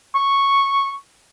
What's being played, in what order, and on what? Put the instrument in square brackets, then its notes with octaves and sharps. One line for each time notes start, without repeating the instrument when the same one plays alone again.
[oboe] C#6